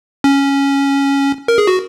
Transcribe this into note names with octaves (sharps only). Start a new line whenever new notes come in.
C#4
A#4
G#4
F#4